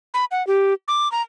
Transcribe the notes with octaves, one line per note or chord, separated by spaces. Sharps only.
B5
F#5
G4
D6
A#5